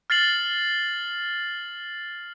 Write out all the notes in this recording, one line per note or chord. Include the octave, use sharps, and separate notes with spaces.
F6 A6 C7 F#7